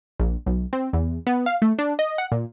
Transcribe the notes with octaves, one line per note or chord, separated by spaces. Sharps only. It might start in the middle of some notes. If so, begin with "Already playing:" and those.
A#1
B1
C4
E2
B3
F5
A3
D4
D#5
F#5
A#2